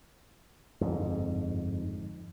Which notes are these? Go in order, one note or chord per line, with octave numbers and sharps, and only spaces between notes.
G1 F2 G#2